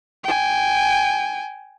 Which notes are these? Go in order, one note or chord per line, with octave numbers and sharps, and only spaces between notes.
G5 G#5